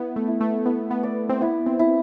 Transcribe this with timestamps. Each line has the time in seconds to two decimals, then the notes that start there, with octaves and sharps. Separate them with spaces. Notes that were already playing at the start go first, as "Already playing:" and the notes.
Already playing: B3 E4
0.16 A3
0.28 E4
0.41 A3
0.66 B3 E4
0.91 B3
1.03 D5
1.29 C4
1.41 B3 E4
1.66 C4
1.79 E4